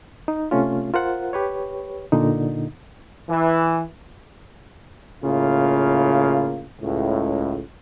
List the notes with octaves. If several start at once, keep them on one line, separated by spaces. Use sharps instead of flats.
D#4
C3 A3 C#4 F4
F4 A#4 C5 F#5
G4 B4 C#5
A#2 D3 D#4
E3
A2 C#3 A#3 F4
C#2 A2